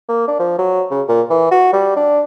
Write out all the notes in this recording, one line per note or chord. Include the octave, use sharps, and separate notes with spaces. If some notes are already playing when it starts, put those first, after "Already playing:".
A#3
D4
F3
F#3
C#3
A#2
E3
F#4
G3
D4